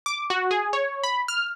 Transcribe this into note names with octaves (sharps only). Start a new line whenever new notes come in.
D6
F#4
G#4
C#5
B5
F6